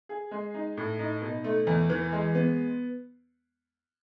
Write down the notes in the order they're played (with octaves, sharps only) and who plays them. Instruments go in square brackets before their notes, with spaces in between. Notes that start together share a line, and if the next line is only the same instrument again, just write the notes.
[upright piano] G#4
G#3
D#4
A2
D#4
B2
A3
E2
E3
G#3
B3